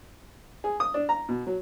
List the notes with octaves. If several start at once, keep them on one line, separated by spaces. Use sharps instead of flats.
G#4
D#6
D4
A#5
B2
F#3